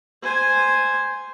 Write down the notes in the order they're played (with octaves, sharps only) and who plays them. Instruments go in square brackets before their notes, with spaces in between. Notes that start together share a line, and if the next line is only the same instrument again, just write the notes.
[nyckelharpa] C5 G#5